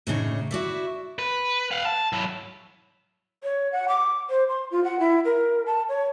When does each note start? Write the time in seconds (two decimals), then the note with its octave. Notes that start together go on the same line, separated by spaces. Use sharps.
0.07 D2 A2 C#3 D4 D#4
0.51 E4 F#4 D5 E5
1.19 B4
1.71 F5 F#5
1.85 A5
2.13 F#3 E4
3.44 C#5
3.72 F#5
3.88 D6
4.30 C5
4.49 C6
4.71 F4
4.84 F#5
5.00 E4
5.25 A#4
5.66 A5
5.89 C#5